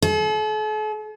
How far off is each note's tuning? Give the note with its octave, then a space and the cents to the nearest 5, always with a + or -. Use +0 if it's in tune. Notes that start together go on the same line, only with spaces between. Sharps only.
A4 -45